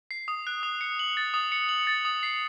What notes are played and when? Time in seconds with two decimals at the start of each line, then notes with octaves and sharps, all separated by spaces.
0.11 C7
0.28 D#6
0.47 F#6
0.63 D#6
0.81 C#7
0.99 F#7
1.17 A6
1.34 D#6
1.52 C#7
1.69 F#7
1.87 A6
2.05 D#6
2.23 C7